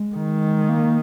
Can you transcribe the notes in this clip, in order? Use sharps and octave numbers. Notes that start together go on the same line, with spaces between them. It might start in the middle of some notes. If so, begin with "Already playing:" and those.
Already playing: G#3
D#3
A#3